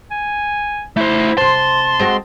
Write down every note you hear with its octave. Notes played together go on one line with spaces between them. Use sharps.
G#5
A3 E4 C5
C3 C5 A5 C6
G#3 C4 F#4